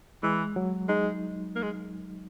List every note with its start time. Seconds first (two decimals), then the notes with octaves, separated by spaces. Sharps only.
0.23 E3 G#3
0.56 F#3
0.89 G#3 D#4
1.56 A#3
1.62 G#3